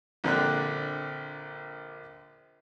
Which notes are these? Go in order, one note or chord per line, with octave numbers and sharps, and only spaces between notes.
A#1 D3 C4 D4 G5 F#6